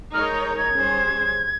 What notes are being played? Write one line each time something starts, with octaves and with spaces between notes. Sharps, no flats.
G#3 D#4 A#4 C#5 F6
G6
G6
G#6
G3 C#4 G#4 C5